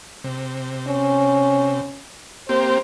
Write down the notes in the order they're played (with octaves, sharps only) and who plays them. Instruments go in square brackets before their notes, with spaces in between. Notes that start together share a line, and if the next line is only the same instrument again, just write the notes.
[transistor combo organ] C3
[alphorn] C#4
[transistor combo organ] A#3 C4 G4 [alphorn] C5